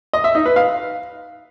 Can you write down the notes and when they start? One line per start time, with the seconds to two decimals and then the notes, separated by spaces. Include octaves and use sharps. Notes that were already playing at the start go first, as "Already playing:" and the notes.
0.13 D#5
0.24 E5
0.35 D#4
0.46 B4
0.56 F5